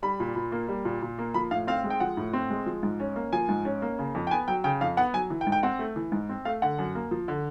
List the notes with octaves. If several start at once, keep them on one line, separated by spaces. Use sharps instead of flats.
G3 B5
A#2
A#2
A#3
G3
A#2
A#2
A#3
F3 B5
A2 F5
C4 F5
G#3
G5
F3 F#5
A2
C4
G#3
F3
G#2
C#4
A#3
F3 G#5
G#2
C#4
A#3
C#3
F2
G5
B3 G#5
F#3 G5
C#3 G5
F2 F5
B3 F#5
F#3 G#5
E3
G5
G#2
G5
C4 F#5
A3
E3
G#2
C4
A3 F5
D3 F#5
F#2
A#3
F3
D3